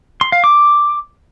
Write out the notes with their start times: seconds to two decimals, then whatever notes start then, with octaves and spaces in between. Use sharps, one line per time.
0.21 C6
0.32 F5
0.44 D6